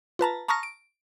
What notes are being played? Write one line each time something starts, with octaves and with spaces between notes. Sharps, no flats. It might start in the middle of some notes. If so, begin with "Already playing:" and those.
F4 B4 A5 A#5
A5 A#5 C#6 D#6 F6 A#6
D7